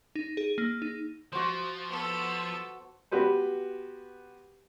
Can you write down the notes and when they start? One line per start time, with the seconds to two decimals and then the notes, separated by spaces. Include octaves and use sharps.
0.15 D#4
0.37 G#4
0.58 A#3
0.82 D#4
1.32 F3 F#4 C5
1.89 B3 A4
3.11 B3 F#4 G4 B4 C5